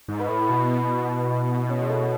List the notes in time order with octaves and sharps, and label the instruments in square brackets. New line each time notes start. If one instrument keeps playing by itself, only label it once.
[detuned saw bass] G#2
[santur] B4
[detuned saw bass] A2
[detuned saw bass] B2 [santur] E4
[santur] C#4
G#3
A3